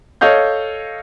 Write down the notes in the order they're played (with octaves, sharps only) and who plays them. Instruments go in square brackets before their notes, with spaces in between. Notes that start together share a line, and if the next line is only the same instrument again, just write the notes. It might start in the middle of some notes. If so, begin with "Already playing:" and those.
[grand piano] A4 C#5 D#5 F5 G6